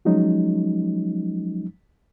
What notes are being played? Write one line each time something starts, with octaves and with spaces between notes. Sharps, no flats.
F3 F#3 G#3 C#4 D#4